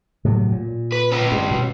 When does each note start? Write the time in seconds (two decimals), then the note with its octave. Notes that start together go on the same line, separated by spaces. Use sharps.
0.25 A2 C3 F#3
0.52 A#2
0.92 B4
1.12 C#4 B4
1.32 G2
1.51 B2